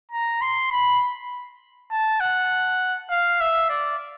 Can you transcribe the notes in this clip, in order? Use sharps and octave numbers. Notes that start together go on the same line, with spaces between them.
A#5
C6
B5
A5
F#5
F5
E5
D5